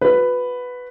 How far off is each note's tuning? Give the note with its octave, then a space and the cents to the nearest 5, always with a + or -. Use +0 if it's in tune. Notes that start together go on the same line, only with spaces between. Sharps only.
F#4 -35 B4 +5